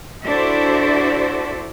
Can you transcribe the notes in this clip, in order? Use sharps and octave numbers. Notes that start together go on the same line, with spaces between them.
D4 E4 F#4 A4 C5 D5